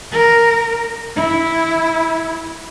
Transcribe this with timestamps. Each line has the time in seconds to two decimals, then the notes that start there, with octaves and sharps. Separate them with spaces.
0.12 A#4
1.16 E4